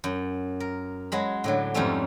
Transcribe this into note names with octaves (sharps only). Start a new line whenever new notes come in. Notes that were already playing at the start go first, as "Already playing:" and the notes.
F#2
A#4
F#3 G#3 B5
A2 D3 F#3
F2 G#2 G3 A3 C#4